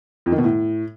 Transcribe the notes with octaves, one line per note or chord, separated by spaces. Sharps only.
F2
D#3
B2
A2